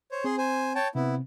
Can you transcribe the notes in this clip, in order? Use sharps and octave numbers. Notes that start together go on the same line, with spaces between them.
C5 C#5
C4 G#4 C6
C5 G#5
C#5 G5 A5
C3 B3 C4 E4